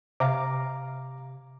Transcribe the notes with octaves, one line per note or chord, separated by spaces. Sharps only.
C3 F5 A#5 D6